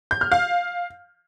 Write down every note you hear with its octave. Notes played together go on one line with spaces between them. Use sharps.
G6
F6
F5